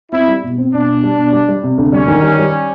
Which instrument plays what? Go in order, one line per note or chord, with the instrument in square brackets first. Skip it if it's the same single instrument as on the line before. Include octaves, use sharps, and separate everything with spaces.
[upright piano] C4 [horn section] E4
[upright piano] G3
B2
C4
[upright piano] B2 [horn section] D4
[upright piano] B2
G3
B2
G3
G3
C3
D2
[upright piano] G3 [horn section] C#4
[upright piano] D#3
G3
G3